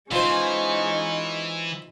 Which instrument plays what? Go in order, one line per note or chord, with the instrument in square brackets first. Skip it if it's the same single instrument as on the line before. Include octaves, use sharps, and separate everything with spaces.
[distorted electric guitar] E3 [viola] G#3 C#4 [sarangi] D#4 [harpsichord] F4 C5